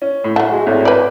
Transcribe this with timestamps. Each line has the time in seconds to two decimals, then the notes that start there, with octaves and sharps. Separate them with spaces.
0.02 C#4
0.24 A2
0.36 F#3 A3 F#5
0.52 G#3 F#4
0.66 G#1 A2
0.85 B4 D5